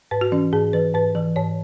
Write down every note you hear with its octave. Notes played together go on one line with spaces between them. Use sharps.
G#2 B4
F#4
E3 C#4
G#2 G#4
E3 B4
G#2 B4
E3
G#2 C#5